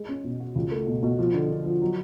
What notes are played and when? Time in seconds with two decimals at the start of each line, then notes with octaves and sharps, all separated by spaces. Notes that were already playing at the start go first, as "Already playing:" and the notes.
Already playing: G#3
0.09 C#4
0.24 B2
0.40 F#4
0.55 C#2
0.71 A3
0.87 B2
1.03 B2
1.19 F3
1.34 D3
1.50 D3
1.65 F3
1.82 F#3